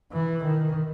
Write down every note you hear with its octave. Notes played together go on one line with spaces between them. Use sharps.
E3
D#3